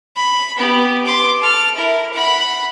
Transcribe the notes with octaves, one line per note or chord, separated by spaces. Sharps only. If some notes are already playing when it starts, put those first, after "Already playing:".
B5
B3 G4
C6 D6
A4 F6
E4 A#4
F#5 B5